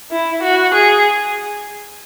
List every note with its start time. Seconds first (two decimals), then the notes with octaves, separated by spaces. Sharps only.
0.12 E4
0.43 F#4
0.74 G#4